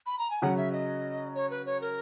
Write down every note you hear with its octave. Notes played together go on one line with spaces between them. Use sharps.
B5
A#5
G#5
C#3 F#3 C#4 F#5
E5
D#5
C#5
B4
C#5
A#4